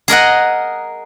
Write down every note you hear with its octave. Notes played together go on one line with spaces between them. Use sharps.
G#4 A#4 D#5 F#5